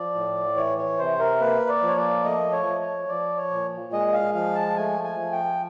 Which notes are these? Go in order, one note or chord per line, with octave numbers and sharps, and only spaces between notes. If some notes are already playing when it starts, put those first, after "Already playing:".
Already playing: F3 D5
A2
E3 C#5
C#5
C3 C5
A#4
A#3 B4
D5
F3
C#5
D5
A3 D#5
C#5
F3
C#5
F3 D5
C#5
A#2
G#3 D#5
F5
F3 F5
A5
A3 G#5
G#5
F3
G5